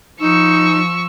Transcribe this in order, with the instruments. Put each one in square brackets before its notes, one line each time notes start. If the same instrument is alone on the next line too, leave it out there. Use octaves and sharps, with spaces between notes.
[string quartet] F3 C#6 E6 [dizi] D#4